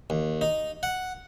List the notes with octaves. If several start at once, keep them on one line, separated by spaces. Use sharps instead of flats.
D#2
D#4
F#5